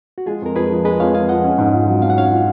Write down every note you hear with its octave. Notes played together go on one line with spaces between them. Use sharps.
F#4
G#3 F4 G#4
F2 A#4
F2 G#4 B4
F3
G#3 B4 D#5
F2 C#5 F5
F2 F5 G#5
F3 D#5 F#5
C#4
G#2
F4
F#3
C#4 F5
F#5
G#2 C#5 F5
F4